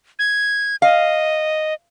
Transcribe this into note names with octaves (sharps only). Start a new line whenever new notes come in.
G#6
D#5 F5